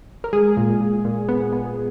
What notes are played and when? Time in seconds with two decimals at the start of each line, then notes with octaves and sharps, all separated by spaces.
0.24 A#4
0.33 G#3 G#4
0.57 A#2
0.81 A#2
1.05 A#2
1.29 B3
1.53 B3